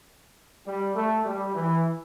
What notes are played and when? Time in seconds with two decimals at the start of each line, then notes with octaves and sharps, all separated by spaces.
0.66 G3
0.95 A3
1.25 G3
1.55 E3